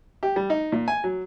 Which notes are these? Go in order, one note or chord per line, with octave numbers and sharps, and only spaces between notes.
G4
G3
D#4
A#2
G#5
F#3